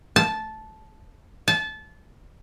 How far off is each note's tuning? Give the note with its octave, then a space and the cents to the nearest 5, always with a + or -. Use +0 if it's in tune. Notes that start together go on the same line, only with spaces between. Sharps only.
A5 -10
A5 -25